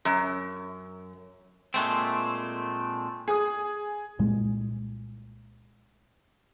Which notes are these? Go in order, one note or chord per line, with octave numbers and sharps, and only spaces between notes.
F#2
A#2 G#3 A3 C4
G#4 D#6
C2 A#2 G#3